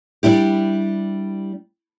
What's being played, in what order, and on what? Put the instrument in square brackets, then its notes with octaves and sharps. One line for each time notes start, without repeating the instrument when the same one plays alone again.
[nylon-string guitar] G3 D4 E4 G4